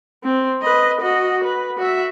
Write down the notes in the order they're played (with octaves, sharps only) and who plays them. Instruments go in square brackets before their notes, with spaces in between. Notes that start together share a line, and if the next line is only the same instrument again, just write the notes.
[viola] C4
B4 D#5
F#4 D#5
B4
F#4 E5